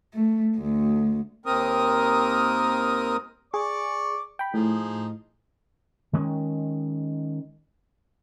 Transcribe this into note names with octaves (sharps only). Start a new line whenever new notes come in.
A3
D2
D#2 C4 A#4 D#6
G#4 D5 C#6 D6
G5 B5
A2 F3 D#4 G#4
D#3 G#3 C#4